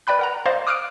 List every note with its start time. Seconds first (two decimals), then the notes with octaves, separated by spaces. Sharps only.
0.07 B4 D5 G5 B5 F#6
0.19 A#4 F#5 A#5
0.46 C5 D5 D#5 F5 C6
0.67 D6 D#6 F6 F#6 C7 D7